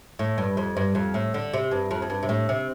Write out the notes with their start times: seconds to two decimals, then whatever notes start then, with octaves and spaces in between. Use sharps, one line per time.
0.19 A2
0.38 G2
0.57 F2
0.77 G2
0.95 F2
1.14 A2
1.34 D3
1.53 C3
1.71 G2
1.91 F2
2.02 F2
2.10 G2
2.23 C3
2.29 A2
2.49 C3